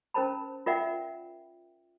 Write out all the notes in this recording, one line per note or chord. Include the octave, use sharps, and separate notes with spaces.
C#4 A#4 C5 A5 B5
F4 A#4 D5 E5 F#5 G5